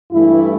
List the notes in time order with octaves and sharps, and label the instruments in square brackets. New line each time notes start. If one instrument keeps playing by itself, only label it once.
[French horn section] G2 E3 A3 E4